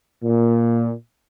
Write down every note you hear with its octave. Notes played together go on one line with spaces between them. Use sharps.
A#2